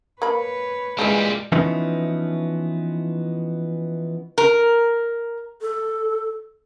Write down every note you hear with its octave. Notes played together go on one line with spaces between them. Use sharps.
A#3 B4 C#5 B5
A#2 C#3 E3 G3 G#3
E3 F3 B3 C#4 D#4 E4
A#4
A4